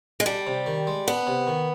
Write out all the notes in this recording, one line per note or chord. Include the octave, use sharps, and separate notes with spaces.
G#3
G3 D4
C3
D#3
G#3
B3 D4
C3
D#3